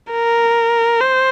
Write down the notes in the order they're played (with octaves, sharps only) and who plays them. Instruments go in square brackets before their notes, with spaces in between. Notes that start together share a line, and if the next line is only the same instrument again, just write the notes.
[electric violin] A#4
C5